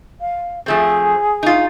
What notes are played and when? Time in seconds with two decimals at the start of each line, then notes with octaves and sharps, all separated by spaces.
0.20 F5
0.66 F3 A3 C4 G#4
1.43 D#4 F4